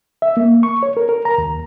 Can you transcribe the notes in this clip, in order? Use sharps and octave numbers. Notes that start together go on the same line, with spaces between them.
E5
A#3
C#6
C#5
A#4
A#4
A#5
D#2